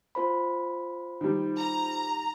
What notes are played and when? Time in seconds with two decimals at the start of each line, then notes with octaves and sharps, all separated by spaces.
0.15 F4 C5 B5
1.21 D#3 G3
1.58 A#5